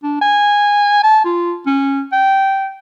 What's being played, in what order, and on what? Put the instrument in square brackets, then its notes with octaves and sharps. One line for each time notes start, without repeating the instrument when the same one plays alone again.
[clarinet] D4
G#5
A5
F4
C#4
G5